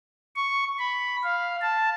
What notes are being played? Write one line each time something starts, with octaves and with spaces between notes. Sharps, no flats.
C#6
B5
F5
A5